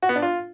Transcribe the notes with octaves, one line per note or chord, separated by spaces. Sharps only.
F#4
B3
D4
F4